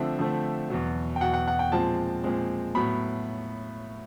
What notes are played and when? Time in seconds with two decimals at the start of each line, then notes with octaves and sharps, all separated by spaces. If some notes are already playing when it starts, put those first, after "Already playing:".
Already playing: D3 F3 A3 C4 E5
0.19 D3 F3 A3 C4
0.70 E2 B2 F#3
1.16 G5
1.21 E2 B2 F#3 F#5
1.33 F#5
1.48 F#5
1.59 G5
1.72 A#2 F3 G#3 C4 A5
2.24 A#2 F3 G#3 C4
2.75 A2 F#3 B3 B5